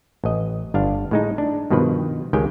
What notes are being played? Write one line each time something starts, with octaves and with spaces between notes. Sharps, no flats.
A1 D#5
G1 D4 F5
A2 G#3 D#4
D4
G2 B2 D#3 F3 B4
C#2 D#3 G#3 G4 G5 G#5